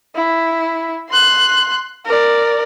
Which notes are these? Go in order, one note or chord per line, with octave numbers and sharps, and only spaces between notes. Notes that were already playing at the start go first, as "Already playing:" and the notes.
E4
C6 F#6
A#4 D5